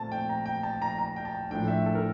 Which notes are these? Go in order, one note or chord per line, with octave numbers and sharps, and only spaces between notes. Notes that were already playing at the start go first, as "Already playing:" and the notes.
Already playing: A#2 A3 C4 A5
G5
A#5
G5
A5
A#5
A#5
G5
A5
A2 F3 A3 D4 G5
E5
A4
A#4